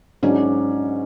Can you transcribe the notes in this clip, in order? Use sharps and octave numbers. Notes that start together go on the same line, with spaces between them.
G#2 F#3 C#4 D4 F#4